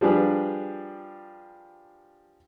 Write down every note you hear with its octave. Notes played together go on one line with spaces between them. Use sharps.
F3 G3 D4 G#4 B4